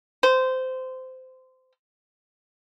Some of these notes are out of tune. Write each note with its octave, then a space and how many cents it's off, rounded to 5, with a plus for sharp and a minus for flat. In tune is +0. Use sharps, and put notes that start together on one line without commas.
C5 -20